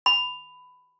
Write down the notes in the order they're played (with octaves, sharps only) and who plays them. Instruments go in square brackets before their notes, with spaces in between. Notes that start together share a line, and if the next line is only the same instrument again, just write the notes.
[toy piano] B5